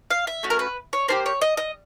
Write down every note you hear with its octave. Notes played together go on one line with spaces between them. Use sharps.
F5
E5
A3 C#4 F#4
A#4
B4
C#5
A#3 D4 G4 C5
C#5
D#5
D#5